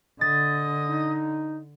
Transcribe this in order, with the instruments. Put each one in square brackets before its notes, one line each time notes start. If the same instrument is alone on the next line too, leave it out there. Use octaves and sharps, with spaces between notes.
[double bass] D3 [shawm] D#5 [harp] A6
[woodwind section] D#4